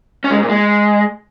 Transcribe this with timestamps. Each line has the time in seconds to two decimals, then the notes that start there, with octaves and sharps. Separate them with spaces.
0.24 C#4
0.30 G#3
0.37 G#2
0.43 A#2
0.49 G#3